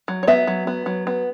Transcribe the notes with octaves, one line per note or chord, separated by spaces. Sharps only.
F#3
C#5
B3 E5
F#3
B3
F#3
B3